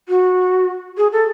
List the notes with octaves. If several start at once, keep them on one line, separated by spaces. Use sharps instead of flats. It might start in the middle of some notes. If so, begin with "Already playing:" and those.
F#4
G#4
A4